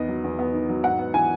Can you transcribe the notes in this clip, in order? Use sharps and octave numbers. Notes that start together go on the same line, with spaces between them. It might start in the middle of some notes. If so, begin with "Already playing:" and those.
Already playing: E2 D#3 B3 D#5
F#3
E2
B3
D#3
F#3
G#2 F#5
B3
E3 G#5